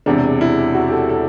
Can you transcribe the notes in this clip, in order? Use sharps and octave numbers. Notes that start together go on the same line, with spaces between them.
E1 E2 C3 D4
E4
F#4
G4
A4
A4